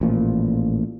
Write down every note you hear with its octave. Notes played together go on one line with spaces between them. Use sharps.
A1 A#2 F3